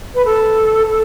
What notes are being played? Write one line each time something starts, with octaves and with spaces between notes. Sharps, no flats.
B4
A4
A4